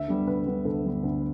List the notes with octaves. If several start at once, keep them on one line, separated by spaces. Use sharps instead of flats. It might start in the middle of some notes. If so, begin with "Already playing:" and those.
Already playing: D2 E5
D3 G3 B3
D2 B4
D3 G3 B3
D2 A4
D3 G3 B3
D2